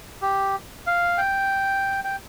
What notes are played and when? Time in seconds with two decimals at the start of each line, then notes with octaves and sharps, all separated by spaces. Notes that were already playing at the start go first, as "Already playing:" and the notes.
0.22 G4
0.87 F5
1.18 G5
2.04 G5